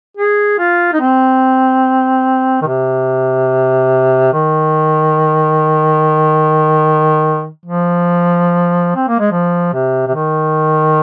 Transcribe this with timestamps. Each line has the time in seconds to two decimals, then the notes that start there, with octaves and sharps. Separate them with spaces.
0.17 G#4
0.59 F4
0.93 D#4
1.00 C4
2.62 D#3
2.67 C3
4.33 D#3
7.65 F3
8.96 C4
9.08 A#3
9.19 G#3
9.31 F3
9.74 C3
10.07 C3
10.15 D#3